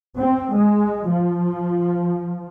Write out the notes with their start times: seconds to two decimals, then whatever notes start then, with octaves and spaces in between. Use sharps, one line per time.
0.18 C4
0.56 G#3
1.10 F3